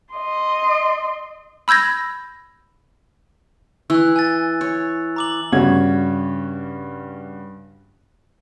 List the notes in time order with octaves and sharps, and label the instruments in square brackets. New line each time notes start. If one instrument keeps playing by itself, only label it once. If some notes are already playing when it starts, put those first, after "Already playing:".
[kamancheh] D#5 C6
[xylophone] B5 E6 G6 G#6 A#6
[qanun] E3 [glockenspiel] E6 F#6
[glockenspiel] G#5 A6
[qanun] C#5
[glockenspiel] A#5 D6 F#7
[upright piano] G2 C#3 F#4 G#6